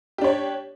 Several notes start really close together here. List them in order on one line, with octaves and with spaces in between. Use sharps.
G4 D4 C#5